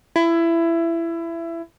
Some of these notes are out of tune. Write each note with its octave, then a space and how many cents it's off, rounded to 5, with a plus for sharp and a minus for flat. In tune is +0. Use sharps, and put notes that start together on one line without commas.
E4 +20